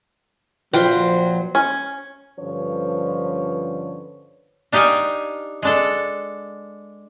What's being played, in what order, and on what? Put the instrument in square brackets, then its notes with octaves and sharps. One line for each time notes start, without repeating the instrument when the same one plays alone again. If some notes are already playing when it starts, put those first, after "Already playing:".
[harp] A#1 [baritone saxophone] F#3 [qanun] F4 G5 [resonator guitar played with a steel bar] B4 C5
[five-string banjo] C#4
[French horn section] G2 D3 F3 C#4 B4 C#5
[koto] D4 D#4 G4 D#5 F5 G#5
G#3 D4 A4